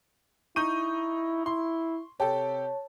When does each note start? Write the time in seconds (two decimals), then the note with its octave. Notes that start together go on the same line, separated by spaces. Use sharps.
0.56 D#4 E4 C#6 G6 D#7
1.46 E4 C6
2.20 C3 G4 A4 C#5 A5